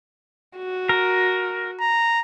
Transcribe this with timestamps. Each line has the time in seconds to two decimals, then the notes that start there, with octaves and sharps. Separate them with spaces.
0.57 F#4
0.89 A#4
1.80 A#5